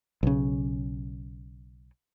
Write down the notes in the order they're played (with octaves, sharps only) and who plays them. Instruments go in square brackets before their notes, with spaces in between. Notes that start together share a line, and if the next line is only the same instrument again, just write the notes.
[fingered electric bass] B1 C#3